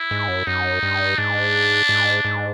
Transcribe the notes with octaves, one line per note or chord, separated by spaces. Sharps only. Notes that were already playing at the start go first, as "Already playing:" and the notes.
Already playing: E4
G#2
F#2
F#2 D#4
G2
G#2 D4
G#2
G#2